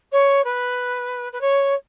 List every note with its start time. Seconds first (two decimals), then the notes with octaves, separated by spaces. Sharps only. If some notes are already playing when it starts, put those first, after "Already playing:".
0.12 C#5
0.44 B4
1.33 B4
1.41 C#5